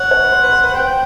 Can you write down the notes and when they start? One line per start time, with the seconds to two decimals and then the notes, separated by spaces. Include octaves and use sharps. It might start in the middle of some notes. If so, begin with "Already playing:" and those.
Already playing: C#5 F#5
0.11 C#5
0.23 B4
0.32 C5
0.43 B4
0.52 C5
0.64 B4
0.74 C5 G5